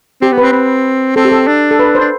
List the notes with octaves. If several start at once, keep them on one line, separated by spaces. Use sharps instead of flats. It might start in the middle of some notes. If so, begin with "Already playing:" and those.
C4 G4
B3
C4 B4
C4
C4 A4
G4
A4
D4
A4
B4
C5
D4